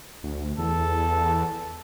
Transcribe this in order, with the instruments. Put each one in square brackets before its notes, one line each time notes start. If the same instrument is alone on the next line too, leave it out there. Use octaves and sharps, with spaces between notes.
[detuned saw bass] D2
[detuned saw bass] E2 [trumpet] A4